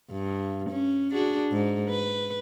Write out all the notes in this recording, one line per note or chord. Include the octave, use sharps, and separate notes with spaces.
G2
C#4
D4 F#4 G#4
G#2
B4